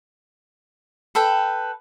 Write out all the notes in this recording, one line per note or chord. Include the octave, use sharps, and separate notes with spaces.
A4 B4 G5